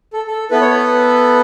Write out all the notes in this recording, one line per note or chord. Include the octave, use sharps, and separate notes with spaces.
A4
A4
B3 E4 A4 B4
C#5
B4